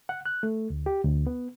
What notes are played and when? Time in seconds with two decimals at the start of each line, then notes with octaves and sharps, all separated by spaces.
0.09 F#5
0.26 F#6
0.43 A3
0.70 D2
0.86 G4
1.05 D2
1.27 B3